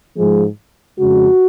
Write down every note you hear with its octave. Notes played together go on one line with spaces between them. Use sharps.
G#2 F3 G#3
F2 C#3 G#3 F#4